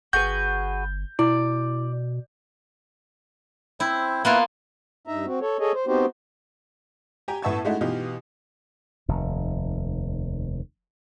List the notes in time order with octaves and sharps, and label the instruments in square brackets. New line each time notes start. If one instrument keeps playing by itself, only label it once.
[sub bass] G1 [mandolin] F#4 G#4 B4 [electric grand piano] G6
[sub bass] B2 [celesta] E4 [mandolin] D5
[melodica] C4 C5 [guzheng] E4
[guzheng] A#3 B3 F4 [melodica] E4 B4
[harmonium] G2 D#4 E5 A#5
C4 F#4
A4 C#5
G#4 A4 C#5 D#5
C5
B3 C4 D#4 F#4 G4 C5
[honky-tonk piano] G4 G5 G#5 A#5
A2 B3 E5 A5 C#6 G#6
G#3 A3 D#4 E4 F#4
B2 E3 D#4 F4 G4
[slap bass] F1 D#2